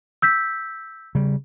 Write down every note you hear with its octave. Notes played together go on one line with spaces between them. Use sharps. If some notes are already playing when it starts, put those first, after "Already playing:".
E6 G6 B6
C#3 G3